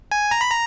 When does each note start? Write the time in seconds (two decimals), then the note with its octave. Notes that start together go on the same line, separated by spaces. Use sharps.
0.12 G#5
0.31 A#5
0.41 B5
0.50 A#5